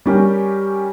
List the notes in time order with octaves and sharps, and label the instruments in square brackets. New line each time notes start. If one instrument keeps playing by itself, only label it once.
[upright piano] G3 C#4 G4 A#4